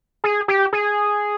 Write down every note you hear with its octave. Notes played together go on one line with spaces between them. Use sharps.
G#4
G4
G#4